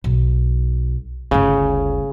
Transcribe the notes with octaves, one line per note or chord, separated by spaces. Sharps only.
B1
G1 D2 C#3